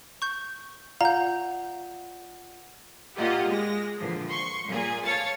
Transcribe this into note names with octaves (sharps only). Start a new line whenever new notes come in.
C#6 G6
F4 D5 F5 F#5 A#5 G6
A#2 A#3 F4 G4 D#5 F#5
G#3 A#6
A#2 D3 E3 F3
C6 C#6
A#2 G#4
C#5 F5 A5 A6 C#7